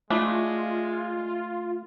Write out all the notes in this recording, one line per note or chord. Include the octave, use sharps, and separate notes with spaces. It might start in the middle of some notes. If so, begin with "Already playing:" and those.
G#3 A3 D4 E4 F4 D#5